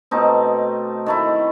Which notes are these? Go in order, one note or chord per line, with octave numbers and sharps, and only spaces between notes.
B2 A3 C4 D#4
D#3 A3 E4